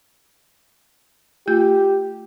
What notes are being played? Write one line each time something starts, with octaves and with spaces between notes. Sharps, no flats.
A3 F4 G4 G6